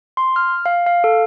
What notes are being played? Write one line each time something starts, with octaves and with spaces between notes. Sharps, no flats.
C6
F6
F5
F5
A4